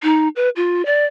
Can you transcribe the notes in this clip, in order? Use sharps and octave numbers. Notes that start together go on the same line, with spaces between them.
D#4
B4
F4
D5